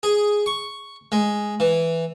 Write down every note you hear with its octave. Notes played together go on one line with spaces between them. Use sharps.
G#4
C#6
G#3
E3